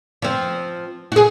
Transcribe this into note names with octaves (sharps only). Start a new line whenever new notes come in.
F3 C4
F#4 G#4